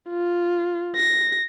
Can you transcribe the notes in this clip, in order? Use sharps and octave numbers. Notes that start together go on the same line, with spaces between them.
F4
A#6